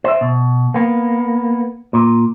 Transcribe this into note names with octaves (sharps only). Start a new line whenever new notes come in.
C5 E5
B2
A#3 B3
A#2